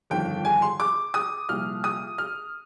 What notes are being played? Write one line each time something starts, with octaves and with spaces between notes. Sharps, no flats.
G1 F2 D#3 G5
G#5
C6
D6
D#6
C2 A#2 F3 F6
D#6
F6